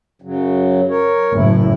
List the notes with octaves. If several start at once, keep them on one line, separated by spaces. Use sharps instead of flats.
F#2 C#3 F#3
A#4 C#5
F#1 A2 E4